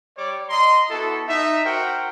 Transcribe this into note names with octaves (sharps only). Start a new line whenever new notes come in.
G3 C#5 D5 D6
D#5 A#5 C6
B3 E4 F#4 A4
D#4 E5
F#4 A#4 C5 F#5 G5